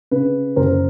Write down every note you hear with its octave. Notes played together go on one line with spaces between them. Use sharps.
C#3 B4
F#1 A#4 C5